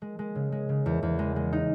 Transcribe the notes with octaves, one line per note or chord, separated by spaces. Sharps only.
G#3
G#3
C#3
G#3
C#3
E2
E2
G#3
G#3
D#4